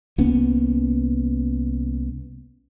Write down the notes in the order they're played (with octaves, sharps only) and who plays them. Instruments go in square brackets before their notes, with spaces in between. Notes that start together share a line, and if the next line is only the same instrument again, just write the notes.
[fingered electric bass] C2 A#3 B3 C#4